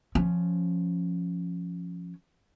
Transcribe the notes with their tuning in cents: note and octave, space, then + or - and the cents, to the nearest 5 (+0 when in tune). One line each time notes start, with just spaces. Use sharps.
F3 +0 C#4 +0